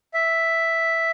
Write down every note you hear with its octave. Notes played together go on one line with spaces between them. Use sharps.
E5